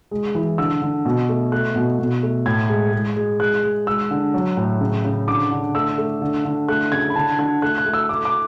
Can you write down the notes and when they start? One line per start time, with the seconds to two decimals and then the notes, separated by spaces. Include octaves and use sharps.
0.11 G#3
0.35 E3
0.58 D3 E6
0.82 D3
1.05 B2
1.29 A3
1.52 A3 F#6
1.76 B2
1.99 B2
2.23 A3
2.46 A2 G#6
2.69 G#3
2.93 G#3
3.16 G#3
3.40 G#3 F#6
3.63 G#3
3.87 G#3 E6
4.11 D3
4.34 F#3
4.57 A2
4.81 C#3
5.04 C#3
5.27 D3 D6
5.51 D3
5.75 A3 E6
5.98 A3
6.22 D3
6.45 D3
6.68 A3 F#6
6.92 C#3 G#6
7.10 B5
7.16 D3 A5
7.38 D3 G#6
7.62 A3 F#6
7.78 F#6
7.86 A3
7.93 E6
8.09 A3 D6
8.25 D6